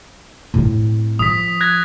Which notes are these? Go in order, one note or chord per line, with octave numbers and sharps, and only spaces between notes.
A2 C4
F3 D#6 B6
F#6 G#6 A#6